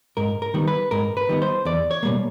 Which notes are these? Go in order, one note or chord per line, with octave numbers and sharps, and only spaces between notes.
G#2 A#4
A#4
D#3 G3 B3
B4
G#2 A#4
B4
D#3 G3 B3
C5
E2 D5
C#5
B2 G3 A#3